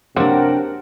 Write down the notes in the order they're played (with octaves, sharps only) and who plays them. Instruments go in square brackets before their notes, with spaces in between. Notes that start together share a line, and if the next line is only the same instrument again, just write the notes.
[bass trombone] C3 [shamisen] F#3 A#3 C5 [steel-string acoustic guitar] D4 F#5 [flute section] A#4 G5